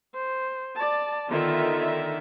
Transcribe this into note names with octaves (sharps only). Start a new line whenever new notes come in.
C5
D5 A5
D3 D#3 B3 F4 E5